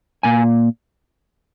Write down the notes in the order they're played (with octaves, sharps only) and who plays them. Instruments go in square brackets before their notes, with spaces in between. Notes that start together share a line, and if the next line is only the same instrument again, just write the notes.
[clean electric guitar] A#2 A#3 G#5